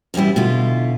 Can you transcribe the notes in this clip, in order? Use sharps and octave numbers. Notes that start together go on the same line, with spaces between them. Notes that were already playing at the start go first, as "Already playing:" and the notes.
F#2 B2 E3 G3 E4
B2 D3 E4 F4